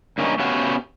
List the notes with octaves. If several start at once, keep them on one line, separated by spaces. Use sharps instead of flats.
G2 A#3 C#4 D#4
A3 B3 C#4 F#4 G4 F5